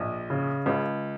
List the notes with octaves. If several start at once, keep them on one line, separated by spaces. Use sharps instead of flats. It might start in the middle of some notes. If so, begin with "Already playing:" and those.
Already playing: A#1 D#5
C#3
C#2